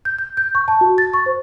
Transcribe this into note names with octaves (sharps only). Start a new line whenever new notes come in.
G6
G6
G6
C#6
A5
F#4
A6
C#6
C5